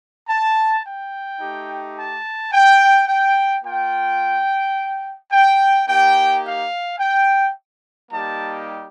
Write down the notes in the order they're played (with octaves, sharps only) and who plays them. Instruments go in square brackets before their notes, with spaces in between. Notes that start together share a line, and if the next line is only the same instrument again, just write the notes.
[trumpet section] A5
G5
A3 D#4 G4
A5
G5
G5
A#3 F4 G5
G5
A#3 D#4 G4 G5
F5
G5
G3 A#3 D#4 G4 A5